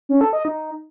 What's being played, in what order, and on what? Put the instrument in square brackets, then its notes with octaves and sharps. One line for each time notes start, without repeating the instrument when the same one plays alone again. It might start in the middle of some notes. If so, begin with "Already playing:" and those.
[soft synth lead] C#4
A4
D#5
D#4